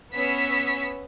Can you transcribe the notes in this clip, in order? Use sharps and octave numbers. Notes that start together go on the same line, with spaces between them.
B3 C#4 C#5 E6 B6